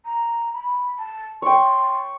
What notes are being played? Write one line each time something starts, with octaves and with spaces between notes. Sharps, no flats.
A#5
B5
A5
C#5 G5 C6